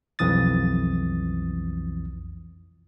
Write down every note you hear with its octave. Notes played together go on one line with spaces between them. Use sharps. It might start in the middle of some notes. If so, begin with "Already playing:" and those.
B1 F2 E3 D#6 A6